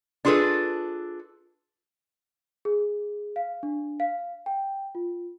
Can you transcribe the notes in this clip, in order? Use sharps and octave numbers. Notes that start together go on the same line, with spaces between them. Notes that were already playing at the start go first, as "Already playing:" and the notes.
D4 F4 G#4 A4 B4
G#4
F5
D4
F5
G5
F4